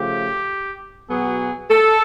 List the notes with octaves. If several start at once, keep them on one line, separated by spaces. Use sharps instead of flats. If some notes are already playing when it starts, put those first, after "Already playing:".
Already playing: C#3 F3 A3 G4
B2 F#3 B3 G#4
A4